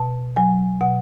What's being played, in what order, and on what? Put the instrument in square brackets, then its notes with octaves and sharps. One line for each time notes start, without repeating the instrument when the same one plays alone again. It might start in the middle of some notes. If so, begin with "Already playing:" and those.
Already playing: [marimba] B2 A5
F#3 G#5
B2 F#5